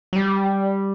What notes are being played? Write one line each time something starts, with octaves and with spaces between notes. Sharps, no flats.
F#3
G3